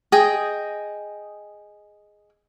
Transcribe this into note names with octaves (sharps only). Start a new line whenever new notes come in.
G#4 D#5 G5